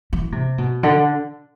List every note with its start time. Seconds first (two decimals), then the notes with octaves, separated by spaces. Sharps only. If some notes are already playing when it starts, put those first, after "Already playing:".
0.13 E3
0.32 C3
0.58 B2
0.83 D3